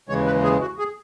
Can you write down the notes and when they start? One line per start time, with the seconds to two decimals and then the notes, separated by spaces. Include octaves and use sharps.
0.09 D#2 C#3 E3 G#3 C#5
0.26 B4
0.43 G#4
0.61 F#4
0.79 G#4